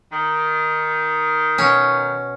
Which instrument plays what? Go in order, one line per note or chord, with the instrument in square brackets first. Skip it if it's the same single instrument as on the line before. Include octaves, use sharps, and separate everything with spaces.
[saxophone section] D#3
[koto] B2 C#4